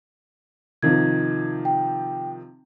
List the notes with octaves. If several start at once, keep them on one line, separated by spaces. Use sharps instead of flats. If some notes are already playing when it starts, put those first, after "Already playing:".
C3 D#3 F3 G#6
G5